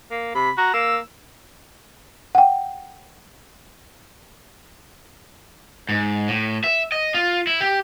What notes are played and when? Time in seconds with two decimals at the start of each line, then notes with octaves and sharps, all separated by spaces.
0.11 A#3
0.35 C3 B5
0.57 F#4 A#5
0.74 A#3 E6
2.35 F#5 G5
5.89 G#2
6.28 A2
6.64 E5
6.92 D#5
7.14 F4
7.47 E4
7.61 G4